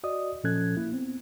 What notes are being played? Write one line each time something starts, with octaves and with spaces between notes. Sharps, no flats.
F#4 D5 D#5 D#6
A#2 F3 C#4 A4 F#6 G#6
A#3 E4
B3 C4